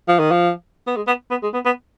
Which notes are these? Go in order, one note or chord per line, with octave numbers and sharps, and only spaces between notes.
F3
D#3
F3
B3
G#3
B3
B3
G#3
B3
B3